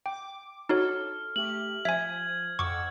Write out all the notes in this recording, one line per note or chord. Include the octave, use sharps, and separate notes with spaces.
G5 D6
D#4 F#4 A4 C#5 F6
A3 G4 F#7
F3 E5 G#5 G#6
F2 F#5 C#6 D6 E6